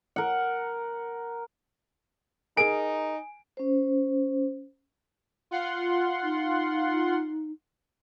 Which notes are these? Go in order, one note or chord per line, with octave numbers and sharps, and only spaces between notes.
A#4 F#5
D#4 G#4 A#4 G#5 D7
C#4 C5
F4 F#5 C6
D#4